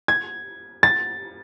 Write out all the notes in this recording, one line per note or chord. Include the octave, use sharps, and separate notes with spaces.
G#6
A6